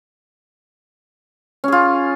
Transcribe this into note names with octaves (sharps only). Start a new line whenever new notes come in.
C#4 F4 G#4